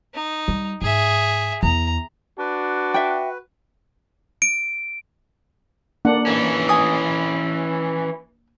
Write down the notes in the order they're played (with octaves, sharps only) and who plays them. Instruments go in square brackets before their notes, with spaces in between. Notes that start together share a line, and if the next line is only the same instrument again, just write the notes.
[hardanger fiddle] D#4
[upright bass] G3
[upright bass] G#2 [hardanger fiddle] G#4 E5
[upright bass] E2 [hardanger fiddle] A#5
[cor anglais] D4 [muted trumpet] F#4 [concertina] B4
[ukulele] E5 G5
[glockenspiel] D7
[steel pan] A#3 D4 F#5
[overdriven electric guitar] E3 C#4
[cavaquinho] G#5 D#6